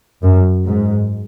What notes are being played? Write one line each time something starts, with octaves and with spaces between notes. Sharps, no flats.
F#2
G#2